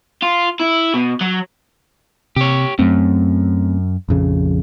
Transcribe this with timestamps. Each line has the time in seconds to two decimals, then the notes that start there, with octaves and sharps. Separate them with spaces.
0.23 F4
0.60 E4
0.94 B2
1.21 F#3
2.36 C3 G4 C#5
2.79 F#2 A3 C4
4.09 A#1 F2 C#3